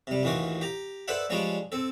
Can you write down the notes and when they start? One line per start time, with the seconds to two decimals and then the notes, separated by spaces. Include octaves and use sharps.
0.07 C3 G3
0.23 A1 D#2 E3 F4 F#4 D6
0.61 G4 A#5
1.08 A4 B4 C5 D5 E5 F#5
1.30 F3 G3 G#3 C#4 D4 D5
1.72 C4 A4